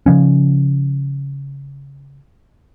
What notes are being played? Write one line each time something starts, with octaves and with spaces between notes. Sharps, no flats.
C#3 F3 C#4